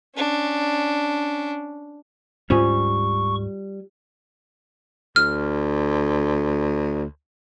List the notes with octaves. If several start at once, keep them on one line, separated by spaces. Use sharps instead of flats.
C#4 D4
D2 G#2 G3 C#4 F4 C5 G#5 C#6
D2 F6